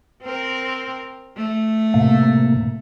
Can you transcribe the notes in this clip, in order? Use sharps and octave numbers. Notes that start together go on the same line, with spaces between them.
C4 A#4
A3
A2 C3 A#3